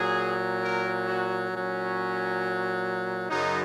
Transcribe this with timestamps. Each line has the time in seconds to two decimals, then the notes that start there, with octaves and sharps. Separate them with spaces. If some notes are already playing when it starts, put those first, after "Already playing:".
Already playing: A#2 F#3 G#4
0.61 A#4
1.07 F#4
1.51 A#2 F#3 C#4
3.30 F#2 C#3 F#3 D#4